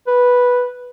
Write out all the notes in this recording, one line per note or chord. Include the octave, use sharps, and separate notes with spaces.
B4